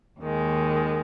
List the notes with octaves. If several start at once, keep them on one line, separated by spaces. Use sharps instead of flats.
D#2 D#3 G#3